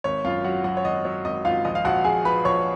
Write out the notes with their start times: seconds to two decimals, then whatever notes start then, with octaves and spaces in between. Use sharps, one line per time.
0.04 G#1 C#5
0.25 F#2 F4 F5
0.44 F#3 F#4 F#5
0.64 F#3 F#4 F#5
0.77 C#5
0.85 G#1 D#5
1.05 F#3 C#5
1.25 G#1 D#5
1.45 G#1 F4 F5
1.65 A#1 D#5
1.75 F5
1.85 A#1 F#4 F#5
2.04 A#1 G#4 G#5
2.25 F3 B4 B5
2.45 A#1 C#5 C#6